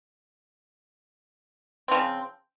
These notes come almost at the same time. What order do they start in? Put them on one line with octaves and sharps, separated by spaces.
C4 F3 C#3